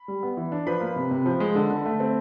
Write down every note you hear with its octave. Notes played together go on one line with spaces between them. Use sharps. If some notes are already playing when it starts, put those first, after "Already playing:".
Already playing: B5
G3
B3
E3
D4
F3 B4 B5
A#3
C3
C3
F3
G#3
D3
D3
A3
C4